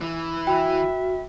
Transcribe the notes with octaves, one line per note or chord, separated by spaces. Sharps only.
E3
F#4 E5 G5 B5